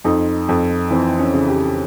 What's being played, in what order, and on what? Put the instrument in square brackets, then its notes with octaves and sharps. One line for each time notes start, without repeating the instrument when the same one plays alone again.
[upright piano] F2 D#4
F2
E3 C4
C#4
C#3
G4